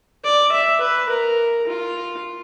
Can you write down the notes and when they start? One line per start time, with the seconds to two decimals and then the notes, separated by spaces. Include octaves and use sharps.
0.24 D5
0.52 E5
0.81 B4
1.09 A#4
1.67 F4